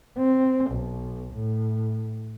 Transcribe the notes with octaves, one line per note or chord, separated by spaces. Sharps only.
C4
B1
A2